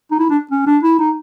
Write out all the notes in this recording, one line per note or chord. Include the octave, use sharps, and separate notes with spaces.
D#4
E4
D4
C#4
D4
E4
D#4